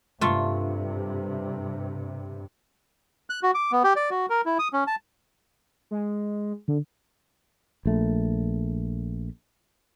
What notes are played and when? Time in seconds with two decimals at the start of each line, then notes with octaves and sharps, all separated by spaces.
0.21 G2 C3 A3 F4
3.30 F#6
3.43 F#4
3.55 D6
3.72 B3
3.84 G4
3.96 D5
4.10 F#4
4.30 A#4
4.46 E4
4.59 D#6
4.73 C#4
4.87 A5
5.91 G#3
6.68 D3
7.86 A#1 A3